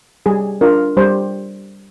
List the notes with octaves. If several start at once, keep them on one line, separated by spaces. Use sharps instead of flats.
G3 G#4
D4 F4 A#4
G3 C5